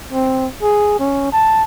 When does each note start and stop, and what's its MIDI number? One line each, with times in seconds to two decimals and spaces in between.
0.12 0.47 60
0.63 0.99 68
1.00 1.28 61
1.32 1.63 81